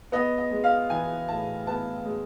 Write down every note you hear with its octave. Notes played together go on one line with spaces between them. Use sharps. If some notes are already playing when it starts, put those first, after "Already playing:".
B3 D#5
D#5
G#3
F5
E3 G#5
A2 A5
B3 A5
G#3